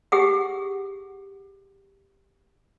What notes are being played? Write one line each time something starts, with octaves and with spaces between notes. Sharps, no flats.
G4 G#4 F#5